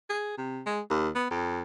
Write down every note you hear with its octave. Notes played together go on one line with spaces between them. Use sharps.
G#4
C3
G#3
D#2
B3
F2